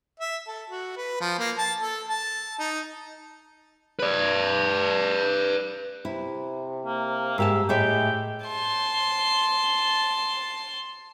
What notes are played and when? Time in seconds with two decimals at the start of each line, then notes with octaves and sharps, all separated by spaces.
0.20 E5
0.48 A4
0.70 F#4
0.97 B4
1.20 F3
1.39 A#3
1.58 A5
1.81 A4
2.08 A5
2.59 D#4
3.99 B4 D5
6.05 C3 E4
6.86 A#3
7.38 G#2 G4 A#4 E5 A5
7.69 A2 G#3 G4 E5 G5
8.46 A5 C6